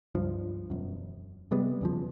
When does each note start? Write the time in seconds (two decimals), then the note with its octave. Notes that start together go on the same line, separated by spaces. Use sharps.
0.15 C#2 G2 F3
0.70 E1 F#2
1.51 C3 G3 G#3 B3
1.81 E2 C#3 F3